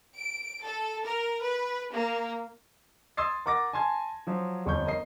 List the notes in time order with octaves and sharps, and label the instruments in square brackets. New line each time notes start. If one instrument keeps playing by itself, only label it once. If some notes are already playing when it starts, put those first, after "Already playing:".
[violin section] D7
A4
A#4
B4
A#3
[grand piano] C6 D#6 E6 G#6 A6 C7
A#4 F#5 D6 A6 A#6
G#5 A5 C6 G#6
F3 F#3
G1 F2 C#5 C#6 G6
A#4 D#5 C7